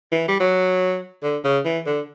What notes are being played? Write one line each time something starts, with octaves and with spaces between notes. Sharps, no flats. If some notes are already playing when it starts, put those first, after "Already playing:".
E3
G3
F#3
D3
C#3
E3
D3